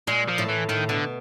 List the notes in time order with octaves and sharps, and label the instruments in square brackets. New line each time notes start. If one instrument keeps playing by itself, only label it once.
[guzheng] A#2 [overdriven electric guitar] G#3
[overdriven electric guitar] F3
[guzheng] A2
[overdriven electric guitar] E3
[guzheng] A2 [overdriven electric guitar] D#3
[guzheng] B2 [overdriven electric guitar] D3